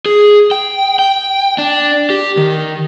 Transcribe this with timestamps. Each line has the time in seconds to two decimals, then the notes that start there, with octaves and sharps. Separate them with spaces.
0.06 G#4
0.51 G5
0.99 G5
1.58 D4
2.10 G4
2.37 D#3